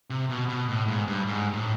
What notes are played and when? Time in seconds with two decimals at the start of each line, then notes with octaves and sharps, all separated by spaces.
0.10 C3
0.29 B2
0.49 B2
0.69 A2
0.88 G#2
1.08 G2
1.27 G#2
1.53 A2